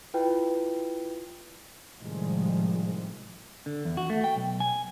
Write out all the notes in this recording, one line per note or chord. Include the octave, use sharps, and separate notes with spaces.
E4 F4 B4 G5
A2 C3 D#3 F3 G3 G#3
D3
E2
F#4
A3
G5
B1
G#5